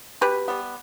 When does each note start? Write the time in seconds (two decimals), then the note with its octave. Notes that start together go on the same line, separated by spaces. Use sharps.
0.21 B2 G4 B4
0.48 G3 B3